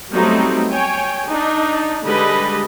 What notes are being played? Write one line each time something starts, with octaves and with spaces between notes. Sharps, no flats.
F#3 G3 A3 B3 C4 D#4
C#5 G5 G#5
D4 D#4
D3 G3 G#3 B4 D#5